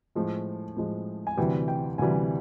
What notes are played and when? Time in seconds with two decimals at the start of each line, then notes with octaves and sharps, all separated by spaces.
0.15 A2 F3 G#3
0.77 A2 F3 G#3
1.27 G#5
1.37 D2 C3 E3 G3 G5
1.68 G5
1.98 D2 C3 E3 G3 G#5